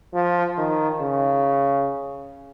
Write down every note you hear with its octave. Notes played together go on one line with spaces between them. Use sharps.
F3
D#3
C#3